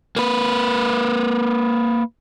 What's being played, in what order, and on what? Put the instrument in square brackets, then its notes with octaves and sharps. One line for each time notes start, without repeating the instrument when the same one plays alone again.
[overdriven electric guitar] A#3 B4